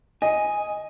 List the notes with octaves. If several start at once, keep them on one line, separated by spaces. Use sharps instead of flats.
D#5 G#5